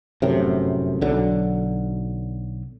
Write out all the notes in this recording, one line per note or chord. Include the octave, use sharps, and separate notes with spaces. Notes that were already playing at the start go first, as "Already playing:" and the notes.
F1 F#2 A2 C3
B1 D3 F#3